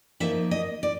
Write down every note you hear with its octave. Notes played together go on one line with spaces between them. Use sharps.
F3 A#3 D#4 E5
D#5
D5